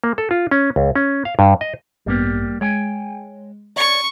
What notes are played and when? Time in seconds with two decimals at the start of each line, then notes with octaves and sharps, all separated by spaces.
0.04 A#3
0.18 A4
0.31 F4
0.51 C#4
0.76 C#2
0.96 C#4
1.25 F5
1.39 G2
1.61 D#5
2.06 A1 G2 G3 A#3 B3 G4
2.61 G#3 C#5 G5 G#5
3.76 C#5 D5 C#6